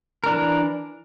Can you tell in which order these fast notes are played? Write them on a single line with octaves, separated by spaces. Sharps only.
A#4 D4 E3